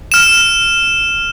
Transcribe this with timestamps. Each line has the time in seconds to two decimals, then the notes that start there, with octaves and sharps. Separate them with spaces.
0.12 F6 E7